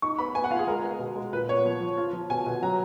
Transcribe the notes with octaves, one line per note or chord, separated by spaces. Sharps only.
D#4 C#6
B3 B5
B3 G#5
F#5
F4 F5
G#4
G#3 A#4
B3
B2
G#3
A#2 B4
B3 C#5
F3
F3
F4
F3
B2 G#5
B2
F#3 A#5